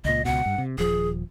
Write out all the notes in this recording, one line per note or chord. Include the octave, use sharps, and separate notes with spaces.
C#2 A#2 D#5
C#2 B2 F#5
G2
C3
D#1 F3 G#4